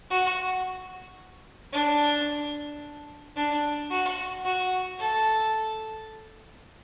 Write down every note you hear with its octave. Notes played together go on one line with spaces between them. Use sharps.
F#4
D4
D4
F#4
F#4
A4